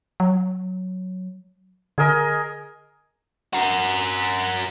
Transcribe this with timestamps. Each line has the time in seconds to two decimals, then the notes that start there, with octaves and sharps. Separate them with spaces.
0.20 F#3
1.98 D3 G#4 A#4 D#5
3.53 F#4 A#4